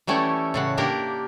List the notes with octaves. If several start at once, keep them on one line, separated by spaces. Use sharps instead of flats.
E3 G3 A3 C#4 E4
A2 C#3 F#5
A#3 D4 G4 A#4